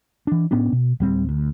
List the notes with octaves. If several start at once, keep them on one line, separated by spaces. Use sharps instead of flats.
E3 D4
A2 B3 C#4 D4
B2
D1 G3 C4
D2